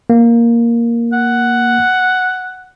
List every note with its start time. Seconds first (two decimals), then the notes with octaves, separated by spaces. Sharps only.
0.10 A#3
1.13 F#5